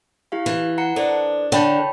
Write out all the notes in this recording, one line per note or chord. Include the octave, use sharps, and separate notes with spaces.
E4 G4 F5
E3
F#5 A#5 C#7
D4 A4 C5 D5
D3 C#5 G5 B5